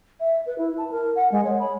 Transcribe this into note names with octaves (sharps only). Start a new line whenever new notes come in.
E5
B4
E4
A5
A#4
F#5
G#3
C#5
B5